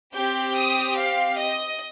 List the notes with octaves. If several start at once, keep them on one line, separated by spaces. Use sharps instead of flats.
C4 G4 G6
D#6
F5
D#5